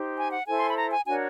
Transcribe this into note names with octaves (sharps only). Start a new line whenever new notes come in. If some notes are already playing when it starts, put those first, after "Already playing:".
Already playing: D#4 G4 C5
G#5
F#5
E4 A4 C5 G#5
C6
B5
A#5
G#5
D4 F#4 A#4 C#5 G#5